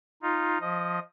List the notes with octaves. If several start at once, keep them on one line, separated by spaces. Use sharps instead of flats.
D#4 F4
F3 D#5